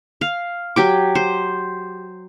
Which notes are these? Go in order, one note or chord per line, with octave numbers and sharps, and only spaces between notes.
F5
F#3 G4 D6
C5